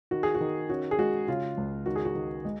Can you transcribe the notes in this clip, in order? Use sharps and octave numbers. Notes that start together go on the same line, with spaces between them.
D#3 F#4
G#4
F#4
D#3
C#4 F#4
G#4
G#3 F#4
C#3 F4
C#2
D#3 F#4
G#4
F#4
D#3
G#3